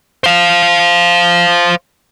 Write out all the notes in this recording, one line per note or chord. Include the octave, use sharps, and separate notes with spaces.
C5 F5